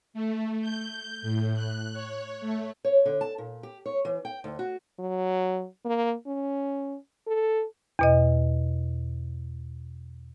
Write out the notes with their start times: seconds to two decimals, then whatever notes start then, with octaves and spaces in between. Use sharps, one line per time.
0.14 A3
0.61 G6
1.22 A2
1.54 F#6
1.93 C#5
2.40 A3
2.84 C#5
3.06 D3
3.21 A5
3.38 A#2
3.63 G4
3.86 C#5
4.05 E3
4.25 G5
4.44 D2
4.59 F#4
4.99 F#3
5.85 A#3
6.27 C#4
7.27 A4
7.99 E2 B2 D#5